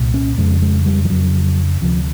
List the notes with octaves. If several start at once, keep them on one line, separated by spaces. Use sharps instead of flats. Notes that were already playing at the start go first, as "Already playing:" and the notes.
Already playing: C2 A#2
C#4
F2 C#3 G#3
G#3
G3
F3
F2 C#3 F#3
D2 C3 F3